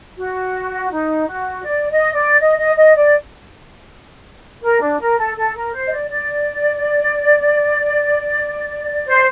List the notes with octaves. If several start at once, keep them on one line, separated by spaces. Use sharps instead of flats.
F#4
D#4
F#4
D5
D#5
D5
D#5
D#5
D#5
D5
A#4
D4
A#4
A4
A4
A#4
C5
D#5
D5
D5
C5